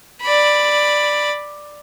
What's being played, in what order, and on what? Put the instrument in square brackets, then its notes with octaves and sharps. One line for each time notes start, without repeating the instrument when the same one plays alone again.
[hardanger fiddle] D5 B5